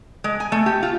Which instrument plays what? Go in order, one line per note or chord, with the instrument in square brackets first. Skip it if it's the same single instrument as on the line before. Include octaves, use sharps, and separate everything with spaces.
[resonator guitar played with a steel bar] G#3
G#5
A3
G4
F4